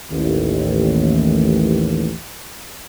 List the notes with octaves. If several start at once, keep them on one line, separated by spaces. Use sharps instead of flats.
A1 D#2